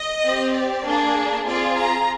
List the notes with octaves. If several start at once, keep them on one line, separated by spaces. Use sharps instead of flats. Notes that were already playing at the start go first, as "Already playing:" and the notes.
Already playing: D#5
C4 G4
D5
A#3 D4 G#4
C4 F4 G#4 D5
A#5